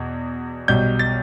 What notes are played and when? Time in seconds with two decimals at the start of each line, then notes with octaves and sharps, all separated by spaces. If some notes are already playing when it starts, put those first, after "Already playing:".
Already playing: E2 B2
0.68 B1 B2 G3 G6
0.99 A6